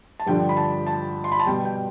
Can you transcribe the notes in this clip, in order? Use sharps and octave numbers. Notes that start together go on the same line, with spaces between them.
A5
G2 D3 F3 G5
B5
A5
A5
C6
B5
A5
B2 G3 G5
G5